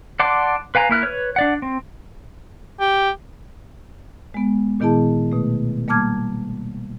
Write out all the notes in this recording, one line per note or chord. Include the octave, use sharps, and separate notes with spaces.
D5 F#5 A5 C6 D6
B4 F5 G#5 A#5
A#3 E4 F6 F#6
B4 C#5
D4 D5 F#5
C4
G4
G#3 B3
A#2 D#3 B3 E4 G#4 A5
B2 A3
G3 A#3 A5 D6 F6 G#6